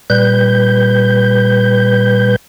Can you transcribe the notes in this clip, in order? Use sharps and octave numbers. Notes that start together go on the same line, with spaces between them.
A#2 G3 B4 G6